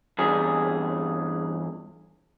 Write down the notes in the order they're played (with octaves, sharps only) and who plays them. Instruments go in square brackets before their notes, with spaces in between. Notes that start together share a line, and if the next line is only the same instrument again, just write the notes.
[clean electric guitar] E2 G2 G#4